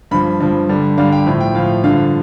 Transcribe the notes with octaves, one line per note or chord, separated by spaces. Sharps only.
G2 F3 B5
G2 F3
G2 D3 G3
G2 D3 G3 F5
G5
A2 F3
G5
A2 F3 F5
G2 D3 F3 F5